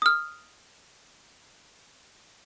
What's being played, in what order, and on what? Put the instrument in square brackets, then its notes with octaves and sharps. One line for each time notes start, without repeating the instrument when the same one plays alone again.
[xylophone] D#6 F6